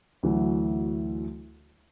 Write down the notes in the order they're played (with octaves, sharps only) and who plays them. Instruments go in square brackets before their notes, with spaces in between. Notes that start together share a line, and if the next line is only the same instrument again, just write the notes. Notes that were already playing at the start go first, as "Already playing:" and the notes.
[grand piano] D2 E3 F#3